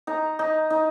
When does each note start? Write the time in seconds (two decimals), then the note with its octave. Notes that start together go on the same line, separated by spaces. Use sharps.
0.07 D#4 A#5
0.39 D#4
0.70 D#4